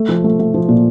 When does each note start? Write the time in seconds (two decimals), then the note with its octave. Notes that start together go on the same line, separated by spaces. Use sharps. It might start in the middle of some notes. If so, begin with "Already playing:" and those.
Already playing: A3
0.09 F3
0.24 A3
0.39 A3
0.54 F3
0.68 A#2